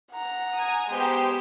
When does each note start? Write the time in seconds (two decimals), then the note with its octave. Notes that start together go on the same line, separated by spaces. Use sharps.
0.12 F#5 A#5
0.55 G#5 D#6
0.90 G#3 B3 G4 C5